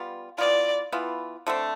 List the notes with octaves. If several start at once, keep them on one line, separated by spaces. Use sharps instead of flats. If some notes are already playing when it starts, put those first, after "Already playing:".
Already playing: G3 B3 F4
E3 B3 F4 D5
E3 B3 F4
D3 A3 C4